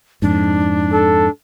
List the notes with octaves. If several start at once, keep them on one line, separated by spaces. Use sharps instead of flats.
F2 G#2 D4
A4